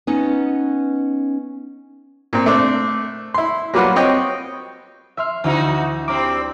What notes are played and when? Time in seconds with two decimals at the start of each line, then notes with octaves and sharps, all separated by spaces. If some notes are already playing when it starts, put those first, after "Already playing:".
0.07 B3 C#4 D#4
2.33 A#2 C4
2.46 A3 C4 D4
3.34 E4 C6
3.74 F#3 G3 A#3 F4 B4 F#5
3.96 C4 C#5 D#5 G5
5.17 E5 C6 F6
5.44 D2 E3 D#4 E4 F#4
6.08 G3 C4 C5 A#5 D6